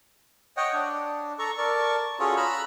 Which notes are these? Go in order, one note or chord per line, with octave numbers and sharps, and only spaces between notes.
C#5 D#5 F#5 G5
D4
A4 A#5 C#6
A#4 D5 A5 C#6
C#4 F4 F#4 G#4 A4 C#5
A#5 B5 E6 F#6